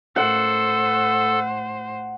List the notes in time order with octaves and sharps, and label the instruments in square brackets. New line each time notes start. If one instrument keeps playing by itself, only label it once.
[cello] A2 C5 [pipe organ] A4 [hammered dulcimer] F#5